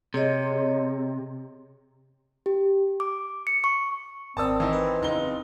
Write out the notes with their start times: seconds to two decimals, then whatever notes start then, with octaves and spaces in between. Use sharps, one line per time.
0.14 C3 G#4 C#5 D#5
2.46 G4
3.00 D6
3.47 C#7
3.64 C#6
4.37 G#1 C4 A#4 D5 A5 D#6 E6
4.60 E3 D#4
4.73 B4
5.01 F#1 D#4 G7